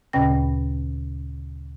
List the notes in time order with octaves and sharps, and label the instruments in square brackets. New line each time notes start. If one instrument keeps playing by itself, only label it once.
[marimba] D2 A#2 C#3 C#4 G5 A#6